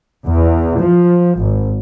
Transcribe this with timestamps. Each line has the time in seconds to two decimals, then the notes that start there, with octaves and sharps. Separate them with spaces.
0.25 E2
0.80 F3
1.39 G#1